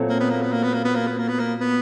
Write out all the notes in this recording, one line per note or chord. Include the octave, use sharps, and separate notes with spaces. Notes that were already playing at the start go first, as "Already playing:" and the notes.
Already playing: A#2 F#3 A3 C4
A#3
B3
A#3
B3
A#3
B3
A#3
B3
A#3
B3
A#3
B3
A#3
B3